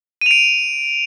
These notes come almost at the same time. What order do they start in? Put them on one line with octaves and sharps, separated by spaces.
D#7 F7 D7